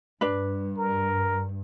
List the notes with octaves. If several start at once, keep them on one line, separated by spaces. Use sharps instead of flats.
G2 D4 B4
A#4